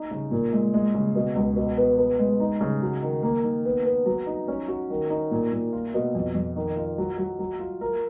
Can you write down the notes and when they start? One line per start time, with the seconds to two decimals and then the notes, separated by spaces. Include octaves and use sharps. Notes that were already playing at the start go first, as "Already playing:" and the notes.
Already playing: D#4
0.11 C#3
0.31 A#2
0.53 G#3
0.74 G#3
0.95 C#3
1.15 B2
1.36 C#2
1.56 B2
1.77 B3
1.98 B3
2.19 G#3
2.40 D#4
2.61 C#3
2.82 F#3
3.02 D#3
3.23 A#3
3.44 D#3
3.65 B3
3.85 B3
4.06 F#3
4.26 D#4
4.48 C#4
4.68 F#4
4.90 D#3
5.10 D#4
5.31 A#2
5.52 A#2
5.73 F4
5.94 B2
6.15 F2
6.35 F2
6.56 D#3
6.76 F4
6.98 F#3
7.18 F#3
7.39 F#3
7.59 F4
7.81 A#4